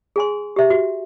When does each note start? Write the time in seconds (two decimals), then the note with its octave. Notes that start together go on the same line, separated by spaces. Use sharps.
0.16 G#4 G#5 C6
0.56 G4 E5
0.70 F#4